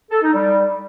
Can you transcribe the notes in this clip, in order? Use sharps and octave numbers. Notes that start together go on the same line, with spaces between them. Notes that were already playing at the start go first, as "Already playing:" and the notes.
A4
D#4
G3